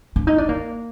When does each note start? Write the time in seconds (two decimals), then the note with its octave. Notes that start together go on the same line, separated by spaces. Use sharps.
0.16 D4
0.27 D#4
0.38 D4
0.49 A#3